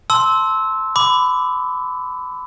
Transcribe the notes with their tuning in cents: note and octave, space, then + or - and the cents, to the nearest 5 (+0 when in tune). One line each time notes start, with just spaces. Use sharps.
A5 +0 C6 +0 E6 -15
B5 +25 D6 +0